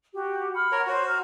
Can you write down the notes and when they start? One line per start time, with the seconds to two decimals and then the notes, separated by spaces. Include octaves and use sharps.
0.14 F#4 G4
0.54 F#5 B5 F6
0.72 A#4 C#5
0.87 F#4 C5 C#5
1.08 A#5 F6